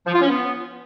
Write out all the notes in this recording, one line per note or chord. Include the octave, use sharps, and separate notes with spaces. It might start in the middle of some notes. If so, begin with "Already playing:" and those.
F3
F4
C#4
B3